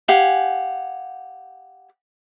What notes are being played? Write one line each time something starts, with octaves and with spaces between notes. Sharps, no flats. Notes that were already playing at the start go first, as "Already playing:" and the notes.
G4 F5 F#5 G#5